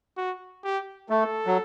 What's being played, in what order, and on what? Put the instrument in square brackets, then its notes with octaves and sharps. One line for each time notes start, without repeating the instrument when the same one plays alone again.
[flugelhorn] F#4
G4
[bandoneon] A3 [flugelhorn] A4
[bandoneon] F#3